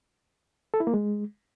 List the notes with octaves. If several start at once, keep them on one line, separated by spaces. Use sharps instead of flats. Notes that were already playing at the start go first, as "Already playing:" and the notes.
A4
E4
A#3
G#3